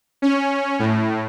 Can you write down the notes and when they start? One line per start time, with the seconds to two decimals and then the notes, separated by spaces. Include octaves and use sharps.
0.22 C#4
0.79 A2